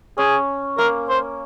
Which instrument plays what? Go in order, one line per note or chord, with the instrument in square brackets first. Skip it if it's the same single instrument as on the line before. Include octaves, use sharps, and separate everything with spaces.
[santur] C#4 [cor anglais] G#4
[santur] A#3 [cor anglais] A#4
[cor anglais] C5